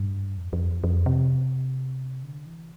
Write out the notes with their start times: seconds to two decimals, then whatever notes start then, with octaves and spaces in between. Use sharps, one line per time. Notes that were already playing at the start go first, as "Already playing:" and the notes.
Already playing: G2
0.37 F2
0.53 F2
0.84 F2
1.06 C3
2.23 D3
2.47 E3